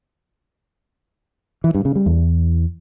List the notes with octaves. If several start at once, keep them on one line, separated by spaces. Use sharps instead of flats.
E3
G2
C#3
G3
E2